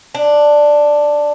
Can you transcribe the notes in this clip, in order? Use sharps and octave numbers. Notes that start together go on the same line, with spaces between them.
D4